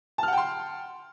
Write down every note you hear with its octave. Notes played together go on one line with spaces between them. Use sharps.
F#5 G5 A5 C6 F6